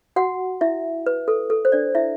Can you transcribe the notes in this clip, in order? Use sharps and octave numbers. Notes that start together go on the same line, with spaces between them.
F#4 F#5
E4 E5
B4
A4
A4
C5
D4 D5
E4 E5